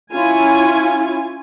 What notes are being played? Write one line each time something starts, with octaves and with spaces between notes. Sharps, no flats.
C#4 E4 F4 G#5